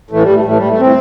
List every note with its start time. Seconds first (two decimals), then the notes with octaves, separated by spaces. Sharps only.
0.11 A2 E3 A3
0.22 G3
0.34 A3
0.45 A2 E3 A3
0.56 G3
0.69 A3
0.79 E3 C4